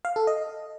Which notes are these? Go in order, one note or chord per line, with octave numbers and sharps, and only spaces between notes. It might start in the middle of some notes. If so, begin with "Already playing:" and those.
F5
A4
D#5